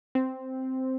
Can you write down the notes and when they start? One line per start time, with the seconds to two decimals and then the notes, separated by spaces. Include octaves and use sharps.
0.15 C4